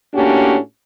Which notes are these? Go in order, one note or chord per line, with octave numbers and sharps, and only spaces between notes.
A2 A#3 C#4 D4 F#4 G4